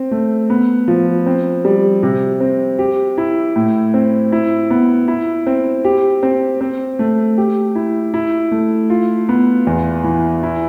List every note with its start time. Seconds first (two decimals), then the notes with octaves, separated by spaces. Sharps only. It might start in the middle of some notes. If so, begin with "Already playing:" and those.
Already playing: C4
0.11 A3
0.50 B3
0.88 F3
1.26 C4
1.65 G3
2.03 C3
2.40 C4
2.79 G4
3.18 E4
3.56 A2
3.94 C4
4.32 E4
4.70 B3
5.08 E4
5.47 C4
5.85 G4
6.23 C4
6.61 C4
6.99 A3
7.38 G4
7.75 E4
8.14 E4
8.52 A3
8.90 F4
9.29 B3
9.67 E2
10.04 E3
10.43 E4